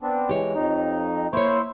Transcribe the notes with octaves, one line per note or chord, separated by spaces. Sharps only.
B3 C4 D4
E3 G#3 G4 C#5
F2 D#4
A#3 E4 C5 C#5 C#6